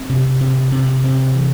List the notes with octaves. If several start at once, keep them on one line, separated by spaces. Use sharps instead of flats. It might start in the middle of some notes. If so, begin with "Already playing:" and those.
Already playing: C4
C3
C3
C3
C3
E3